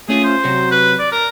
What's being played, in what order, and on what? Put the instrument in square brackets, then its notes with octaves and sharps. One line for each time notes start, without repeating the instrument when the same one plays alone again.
[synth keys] A3 C#4 F4 [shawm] G#4
[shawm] C5
[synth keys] C3 F#3 F#4
[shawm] B4
D5
A#4